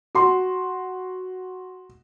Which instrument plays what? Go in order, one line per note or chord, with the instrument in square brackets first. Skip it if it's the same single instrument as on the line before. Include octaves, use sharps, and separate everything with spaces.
[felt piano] F#4 C6